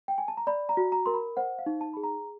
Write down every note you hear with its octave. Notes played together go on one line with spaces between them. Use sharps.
G5
G#5
A5
A#5
D5 B5
A#5
F#4
A#5
A#4 C6
B5
C5 F#5
F5
D#4
A5
G#4 B5
A#5